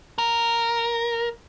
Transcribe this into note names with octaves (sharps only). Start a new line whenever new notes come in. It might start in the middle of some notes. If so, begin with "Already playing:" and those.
A#4